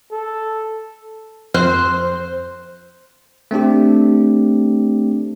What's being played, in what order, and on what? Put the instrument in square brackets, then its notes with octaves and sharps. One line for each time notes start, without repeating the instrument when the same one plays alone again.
[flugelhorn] A4
[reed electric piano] F2 [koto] C4 [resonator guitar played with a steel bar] C5 [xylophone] F6 F#6
[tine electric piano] A3 C4 D4 G4